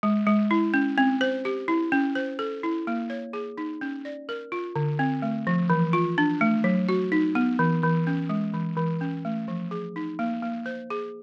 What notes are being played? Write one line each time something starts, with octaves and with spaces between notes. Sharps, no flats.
G#3
G#3
E4
C#4
C4
C5
G4
E4
C#4
C5
A4
E4
A#3
C#5
G#4
D#4
C#4
D5
A#4
F4
D3
C4
A3
F3
E3
F4
D4
A3
F#3
F#4
D#4
B3
E3
E3
C#4
G#3
E3
E3
C#4
A3
F3
G#4
D#4
A#3
A#3
C5
G#4